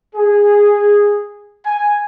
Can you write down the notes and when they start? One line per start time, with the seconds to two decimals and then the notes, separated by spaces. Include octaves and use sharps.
0.16 G#4
1.65 G#5